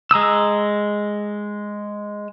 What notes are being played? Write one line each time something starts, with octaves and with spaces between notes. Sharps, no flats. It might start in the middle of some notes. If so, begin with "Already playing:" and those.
G#3 A#5 D#6 E6